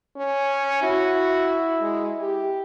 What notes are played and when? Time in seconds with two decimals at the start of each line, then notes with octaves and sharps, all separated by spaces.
0.16 C#4
0.83 E4 F#4
1.81 G#3
2.20 G4